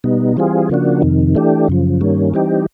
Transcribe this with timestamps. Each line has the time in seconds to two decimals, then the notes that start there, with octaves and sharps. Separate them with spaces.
0.04 B2 G3 B3 D#4
0.37 E3 G3 C4 F4 G#4
0.70 C#3 F3 A#3 D4 F#4
1.02 F2 C3 D#3
1.35 E3 A3 D4 G4
1.68 F#2 C#3 F3
2.01 G2 D#3 G3 A#3 C#4
2.34 E3 G3 C4 D#4 G4